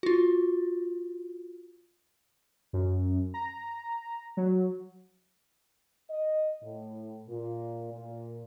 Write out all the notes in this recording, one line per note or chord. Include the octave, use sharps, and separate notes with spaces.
F4 F#4
F#2
A#5
F#3
D#5
A2
A#2
A#2